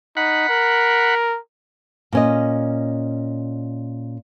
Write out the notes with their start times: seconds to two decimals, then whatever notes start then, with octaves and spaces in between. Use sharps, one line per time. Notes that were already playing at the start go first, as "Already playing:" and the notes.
0.17 D#4 F#5 B5
0.49 A#4
2.12 A#2 C#4 D#5